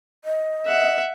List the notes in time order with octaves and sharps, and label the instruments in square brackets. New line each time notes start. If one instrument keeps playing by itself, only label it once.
[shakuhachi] D#5
[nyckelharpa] E5 F#5